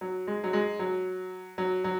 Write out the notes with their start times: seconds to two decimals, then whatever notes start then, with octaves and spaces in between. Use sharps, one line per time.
0.01 F#3
0.27 G#3
0.44 F#3
0.53 G#3
0.79 F#3
1.58 F#3
1.84 F#3